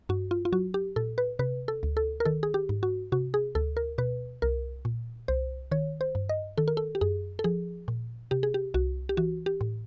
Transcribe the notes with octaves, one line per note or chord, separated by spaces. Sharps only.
G2 F#4
F4
F4
F#3 F#4
G4
A#2 A4
B4
C3 B4
A4
D2
A4
A#4
D#3 A4
G#4
G4
G#2
F#4
C3 F#4
G#4
D2 A4
A#4
B2 B4
C2 A#4
A#2
C2 C5
D#3 C#5
C5
G2
D#5
D#3 A4
A#4
A4
G4
F#2 G#4
A4
F3 G#4
A#2
C3 G4
G#4
G4
C2 F#4
G4
E3 F#4
G4
A2